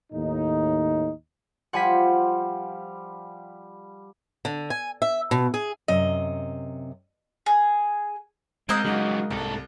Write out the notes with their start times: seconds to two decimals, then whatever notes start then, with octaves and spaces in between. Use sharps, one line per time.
0.13 D#2 A2 D#4
1.73 F3 G3 F#5 G#5 B6
4.45 D3
4.70 G#5
5.02 E5
5.31 B2
5.54 G#4
5.88 F#2 C3 D#5
7.46 G#4
8.69 G#3 A#3 C4 A#4 D#5 E6 F#6 G6
8.85 G#2 C#3 F#3 D#4 F#4
9.31 C2 G#2 A4